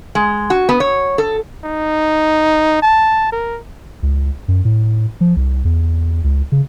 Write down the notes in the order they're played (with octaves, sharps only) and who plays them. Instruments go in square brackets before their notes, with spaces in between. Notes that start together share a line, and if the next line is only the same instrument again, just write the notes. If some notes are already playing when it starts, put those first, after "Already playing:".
[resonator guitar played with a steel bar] G#3
F#4
B3
C#5
A4
[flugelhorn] D#4
A5
A#4
[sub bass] C#2
F#2
A2
F3
C2
E2
C#2
C#3